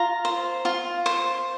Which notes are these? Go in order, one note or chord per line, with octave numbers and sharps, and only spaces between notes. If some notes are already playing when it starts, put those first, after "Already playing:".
Already playing: F4 A#5
C5
F4
C5